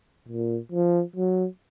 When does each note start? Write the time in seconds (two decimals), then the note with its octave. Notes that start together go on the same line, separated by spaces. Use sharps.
0.29 A#2
0.72 F3
1.16 F#3